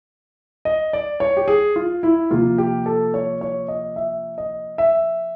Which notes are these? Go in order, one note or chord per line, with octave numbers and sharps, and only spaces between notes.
D#5
D5
C#5
G4
G#4
F4
E4
C3 F3 A#3 F4
G4
A4
C#5
C#5
D#5
E5
D#5
E5